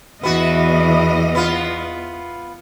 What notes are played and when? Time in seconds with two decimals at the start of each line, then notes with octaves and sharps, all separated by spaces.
0.23 E2 E3 B3 F#4 D#5
1.35 B3 F4